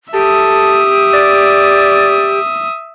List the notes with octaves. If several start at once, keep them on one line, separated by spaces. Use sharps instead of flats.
G4 A4 E5 D#6
D5